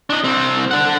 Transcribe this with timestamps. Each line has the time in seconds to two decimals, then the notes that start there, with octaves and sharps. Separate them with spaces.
0.10 D4 D#5
0.24 C2 C4
0.71 D4 F#5